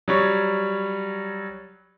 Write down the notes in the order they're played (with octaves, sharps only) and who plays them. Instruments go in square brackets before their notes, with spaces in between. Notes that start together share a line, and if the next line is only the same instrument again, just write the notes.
[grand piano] F#3 G3 C#5